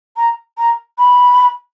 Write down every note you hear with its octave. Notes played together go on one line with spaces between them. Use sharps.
A#5
A#5
B5